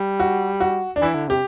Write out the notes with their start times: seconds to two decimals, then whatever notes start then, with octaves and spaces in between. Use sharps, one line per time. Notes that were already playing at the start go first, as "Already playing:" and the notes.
Already playing: G3
0.20 F#4
0.60 F#4
0.96 D4
1.02 E3 E4
1.15 D3
1.28 C3 G4